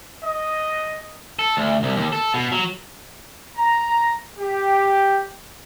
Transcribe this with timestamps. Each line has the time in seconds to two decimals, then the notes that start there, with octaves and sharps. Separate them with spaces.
0.23 D#5
1.39 A4
1.57 D2
1.83 C2
1.96 D#2
2.13 A4
2.34 B2
2.52 F#3
3.56 A#5
4.39 G4